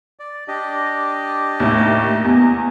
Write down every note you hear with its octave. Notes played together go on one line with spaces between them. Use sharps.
D5
D4 G4 D#5
D#2 A2
E2 D#5